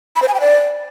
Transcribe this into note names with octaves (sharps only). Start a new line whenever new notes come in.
B5
C5
G#5
G5
D5